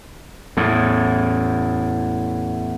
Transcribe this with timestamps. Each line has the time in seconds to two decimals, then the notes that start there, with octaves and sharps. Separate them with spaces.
0.57 E2 A2